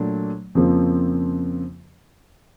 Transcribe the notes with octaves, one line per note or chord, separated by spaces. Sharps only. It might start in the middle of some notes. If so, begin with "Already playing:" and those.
Already playing: A#2 F#3 A3 D4
F2 C#3 F3 A#3